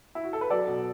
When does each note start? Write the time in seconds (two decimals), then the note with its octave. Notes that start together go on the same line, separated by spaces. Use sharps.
0.15 E4
0.24 F#4
0.33 A4
0.41 B4
0.50 F#3 A4 D5
0.67 B2